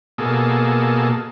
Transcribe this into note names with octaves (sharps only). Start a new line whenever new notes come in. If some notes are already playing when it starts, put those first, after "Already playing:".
B2 A#3 G#4 A4